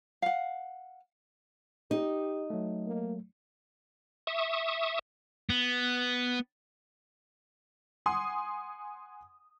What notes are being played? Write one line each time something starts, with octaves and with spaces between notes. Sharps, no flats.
F5 F#5
D#4 G4
F#3 A3
A#3
E5 C#6 D#6
B3
F#5 G#5 C6 D#6